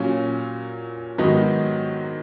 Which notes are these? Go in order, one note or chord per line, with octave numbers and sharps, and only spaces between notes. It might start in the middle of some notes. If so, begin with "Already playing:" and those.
Already playing: A#2 F#3 C#4
G#2 D#3 F#3 B3 D#4